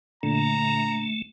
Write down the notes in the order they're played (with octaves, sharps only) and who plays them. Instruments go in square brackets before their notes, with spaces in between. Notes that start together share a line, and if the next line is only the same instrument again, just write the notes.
[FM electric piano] A#2 D3 [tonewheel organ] A3 [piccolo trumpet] A#5